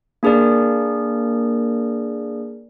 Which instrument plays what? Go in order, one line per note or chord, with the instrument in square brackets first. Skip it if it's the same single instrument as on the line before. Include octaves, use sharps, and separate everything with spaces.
[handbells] A#3 D4 G#4 A#4 D5